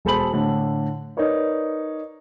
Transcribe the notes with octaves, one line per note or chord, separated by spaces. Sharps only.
E1 G#4 A4 C5 B5 F#7
A2 D3
D#4 A#4 B4 C#5 D5